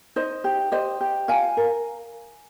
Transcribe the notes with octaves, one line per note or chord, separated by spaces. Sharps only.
D#4 C5 D#5
G4
G4 C5 D#5
G4
F4 F5 G#5
A#4